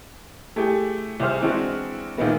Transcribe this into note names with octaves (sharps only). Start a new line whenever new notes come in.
A3 E4 G4 G#4
C2 G#4 C5 F6
E3 G#3 C4 D4 E4 F#4
D2 A#2 D#3 G#3 A#3 B3